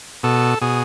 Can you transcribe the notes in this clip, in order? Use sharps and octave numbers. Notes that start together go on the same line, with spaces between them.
B2 A4
B2 G#4